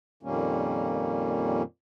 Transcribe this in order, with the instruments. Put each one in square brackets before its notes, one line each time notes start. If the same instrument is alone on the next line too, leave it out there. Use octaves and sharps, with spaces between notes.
[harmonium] F2 A#2 D#3 G3 A#3 C#4